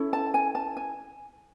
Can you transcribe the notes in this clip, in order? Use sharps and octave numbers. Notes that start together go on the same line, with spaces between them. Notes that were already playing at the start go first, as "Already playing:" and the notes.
Already playing: C#4 E4 A4
A5
G#5
A5
G#5